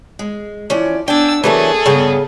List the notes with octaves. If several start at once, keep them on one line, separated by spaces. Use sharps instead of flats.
G#3
E3 F3 C#4 D5
B3 D4 G5 G#5 E6
E3 F#3 A3 A#3 D4 G#4 A4
G2 C#3 B3 G5